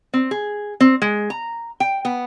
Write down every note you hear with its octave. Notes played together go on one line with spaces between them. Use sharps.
C4
G#4
C4
G#3
A#5
G5
B3